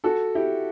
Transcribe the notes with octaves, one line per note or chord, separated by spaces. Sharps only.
F#4 A4
E4 G4